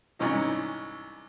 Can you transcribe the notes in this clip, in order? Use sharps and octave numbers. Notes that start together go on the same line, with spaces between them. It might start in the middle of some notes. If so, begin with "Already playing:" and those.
C2 G#2 E3 C#4 D#4